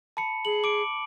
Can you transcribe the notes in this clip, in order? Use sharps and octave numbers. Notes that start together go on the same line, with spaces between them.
A5 B5 C#7
G#4 F#7
D6 D7